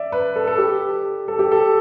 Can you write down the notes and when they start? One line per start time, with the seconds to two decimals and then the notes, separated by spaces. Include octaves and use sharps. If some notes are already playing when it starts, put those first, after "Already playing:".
Already playing: D5 E5
0.12 B4
0.36 A4
0.47 A4
0.58 G4
1.28 A4
1.39 G4
1.52 A4